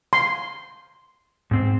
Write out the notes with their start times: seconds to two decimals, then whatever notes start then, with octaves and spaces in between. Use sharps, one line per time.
0.13 C6
1.51 G#2 C4 C5